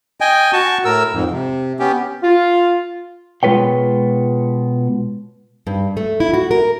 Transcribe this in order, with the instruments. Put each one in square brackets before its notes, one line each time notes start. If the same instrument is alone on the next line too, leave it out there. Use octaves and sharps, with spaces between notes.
[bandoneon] D#5 G5 G#5
F#4 A5 C#6
A2 A#4 E6
F2 G#2
C3
B3 C#4 G4
[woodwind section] F4
[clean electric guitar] B2 G#3 F4 B4 C#5 G5
[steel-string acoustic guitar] G2
A3
E4
F#4
A#4